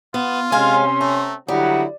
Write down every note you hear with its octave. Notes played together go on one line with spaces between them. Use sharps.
B3 F4
C3 G#3 C4 C#4 F5 G#5 C6
A3 A#5
D3 F#3 G3 D#4 E4 F#5